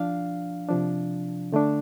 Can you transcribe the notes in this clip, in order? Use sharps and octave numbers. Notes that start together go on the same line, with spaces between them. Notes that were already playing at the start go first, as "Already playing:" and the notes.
Already playing: F3 D4 F5
C3 F3 D4
D3 A3 D4